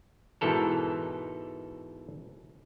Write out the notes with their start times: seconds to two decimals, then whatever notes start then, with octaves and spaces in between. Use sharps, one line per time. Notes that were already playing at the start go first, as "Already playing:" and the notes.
0.41 G#2 B2 E3 A4 A#4